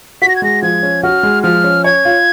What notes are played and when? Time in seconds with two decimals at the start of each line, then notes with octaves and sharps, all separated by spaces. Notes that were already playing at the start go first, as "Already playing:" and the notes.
0.22 F#4 B6
0.29 A#6
0.36 G#6
0.42 G#3 A#6
0.62 F3 G#6
0.83 C#4
1.03 F#4 F6
1.23 G#3
1.43 F3 F6
1.64 C#4
1.84 C#5 G#6
2.05 F4